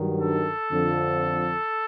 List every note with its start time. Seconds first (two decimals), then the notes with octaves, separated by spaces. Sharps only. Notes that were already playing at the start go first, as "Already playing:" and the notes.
Already playing: G2 D#3 F#3
0.20 A4
0.71 F2 D3 F3